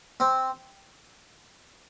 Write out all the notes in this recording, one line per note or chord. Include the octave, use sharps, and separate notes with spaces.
C4